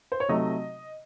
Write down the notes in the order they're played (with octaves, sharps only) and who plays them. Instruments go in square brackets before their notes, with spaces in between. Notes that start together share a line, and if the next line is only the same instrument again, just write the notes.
[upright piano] C5
C#5
[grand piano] C3 F#3 A3 D#4 [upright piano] D#5